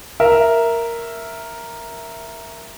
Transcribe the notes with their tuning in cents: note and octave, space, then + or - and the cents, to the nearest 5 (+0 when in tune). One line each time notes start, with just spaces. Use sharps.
A#4 +0 E5 +0